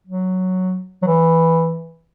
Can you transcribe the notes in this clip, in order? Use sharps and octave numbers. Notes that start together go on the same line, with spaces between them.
F#3
F#3
E3